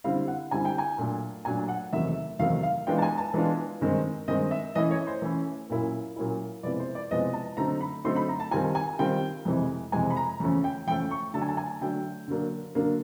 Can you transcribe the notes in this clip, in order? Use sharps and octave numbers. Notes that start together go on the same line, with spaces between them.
D3 G3 C4 E4 F5
F#5
D3 G3 C4 E4 G#5
G5
G#5
A#2 F#3 A3 D4
A#2 F#3 A3 D4 G#5
F#5
E2 C3 D#3 F#3 A3 E5
E2 C3 D#3 F#3 A3 F5
F5
E3 G#3 B3 D4 F4 G5
A5
G#5
A5
E3 G#3 B3 D4 F4
G2 D#3 G#3 C4
G2 D#3 G#3 C4 D#5
E5
E3 A3 C#4 E4 D#5
C#5
C5
E3 A3 C#4 E4
A#2 F#3 A#3 C#4 E4
A#2 F#3 A#3 C#4 E4
C3 F3 G#3 B3 E4 D5
C5
D5
C3 F3 G#3 B3 E4 D#5
A5
D3 F#3 A3 C4 D#4 A#5
B5
D3 F#3 A3 C4 D#4 C6
B5
A#5
A5
D#3 G3 C4 F4 G#5
G#5
D#3 G3 C4 F4 G5
F2 C3 E3 G#3
F2 C3 E3 G#3 G#5
B5
A#5
E2 C#3 F3 A3 C#4
G5
E2 C#3 F3 A3 C#4 G5
C#6
D3 F#3 A3 D4 A5
G#5
A5
G#5
D3 F#3 A3 D4 G5
D3 F#3 A#3 D4
D3 F#3 A#3 D4